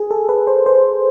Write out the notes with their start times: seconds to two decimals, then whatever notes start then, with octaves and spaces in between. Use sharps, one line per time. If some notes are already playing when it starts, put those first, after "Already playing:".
Already playing: G#4
0.11 A4
0.29 B4
0.47 C5
0.66 C5